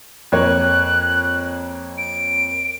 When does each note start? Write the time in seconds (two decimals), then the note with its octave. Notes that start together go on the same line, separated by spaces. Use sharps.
0.32 F2 A#3 C#5 F#6
1.98 D7